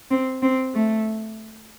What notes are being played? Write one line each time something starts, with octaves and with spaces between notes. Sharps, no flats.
C4
C4
A3